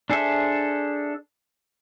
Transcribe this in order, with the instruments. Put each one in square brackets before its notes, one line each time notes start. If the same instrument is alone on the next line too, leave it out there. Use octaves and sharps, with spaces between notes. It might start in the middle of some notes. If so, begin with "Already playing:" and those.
[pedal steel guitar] D4 G#4 A4 C5 E5